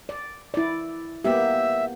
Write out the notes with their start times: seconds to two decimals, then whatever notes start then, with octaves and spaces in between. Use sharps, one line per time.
0.09 D5
0.54 E4 D5
1.24 A#3 B3 G4 E5